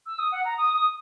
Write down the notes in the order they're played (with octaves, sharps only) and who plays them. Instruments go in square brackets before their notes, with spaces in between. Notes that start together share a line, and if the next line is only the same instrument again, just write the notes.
[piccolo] E6
D#6
F#5
A#5
D#6
D#6